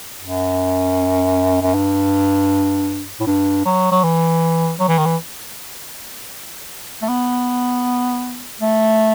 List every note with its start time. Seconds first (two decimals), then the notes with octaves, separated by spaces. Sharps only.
0.22 F#2
1.62 F#2
1.75 G2
3.20 A2
3.27 G2
3.65 F#3
3.92 F#3
4.04 E3
4.80 F#3
4.88 E3
4.98 D#3
5.06 E3
7.02 A3
7.09 B3
8.61 A3